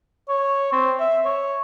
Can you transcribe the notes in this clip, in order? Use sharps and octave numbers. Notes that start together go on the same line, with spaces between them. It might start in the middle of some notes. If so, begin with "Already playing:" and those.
C#5
C4
E5
C#5